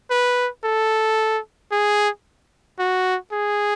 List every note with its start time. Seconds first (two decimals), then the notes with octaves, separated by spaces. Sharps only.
0.11 B4
0.64 A4
1.72 G#4
2.79 F#4
3.32 G#4